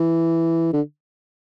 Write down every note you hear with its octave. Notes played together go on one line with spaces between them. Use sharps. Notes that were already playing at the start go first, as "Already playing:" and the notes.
Already playing: E3
D3